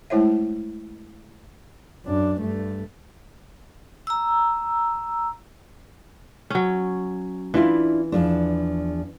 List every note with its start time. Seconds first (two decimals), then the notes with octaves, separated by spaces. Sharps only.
0.10 G#3 A3 E4 C5 C#5 E5
2.06 F#2 D4
2.41 G2 A3
4.07 A#5 E6
6.50 F#3 C#4
7.54 E3 D4 E4 F4
8.12 E2 F3 D4